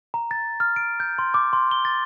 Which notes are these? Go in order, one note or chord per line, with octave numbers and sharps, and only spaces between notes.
A#5
A6
F6
D7
G6
C6
D6
C6
G7
A6